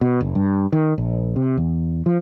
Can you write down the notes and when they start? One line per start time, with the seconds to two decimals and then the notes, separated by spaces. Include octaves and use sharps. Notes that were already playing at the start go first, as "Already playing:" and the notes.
0.01 B2
0.21 F#1
0.35 G2
0.72 D#3
0.98 A#1
1.36 C3
1.57 E2
2.06 F3